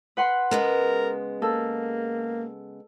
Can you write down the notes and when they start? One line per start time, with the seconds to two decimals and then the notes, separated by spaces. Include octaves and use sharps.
0.17 B4 F#5 C6
0.51 C#3 G#3 B3 A#4
1.42 A#3 A4